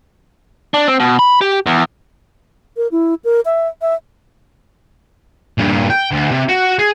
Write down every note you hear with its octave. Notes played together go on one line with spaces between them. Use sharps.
D4
C4
B2
B5
G4
E2
A#4
E4
A#4
E5
E5
G2 A#2
G5
D2
C3
F#4
G#4